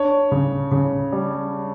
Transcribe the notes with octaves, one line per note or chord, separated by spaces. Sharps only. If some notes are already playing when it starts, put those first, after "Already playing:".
Already playing: D4 C#5
C#3
C#3
G3